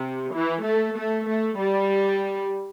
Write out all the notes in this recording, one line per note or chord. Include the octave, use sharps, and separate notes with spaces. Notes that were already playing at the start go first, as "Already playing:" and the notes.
Already playing: C3
E3
A3
A3
A3
G3